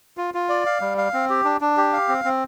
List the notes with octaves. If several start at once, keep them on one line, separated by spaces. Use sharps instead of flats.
F4
F4
D5
F5
G3
F5
C4
G4
D4
D4
G4
F5
C4
C4